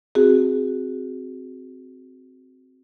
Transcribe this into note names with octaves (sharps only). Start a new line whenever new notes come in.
C4 F#4 G#4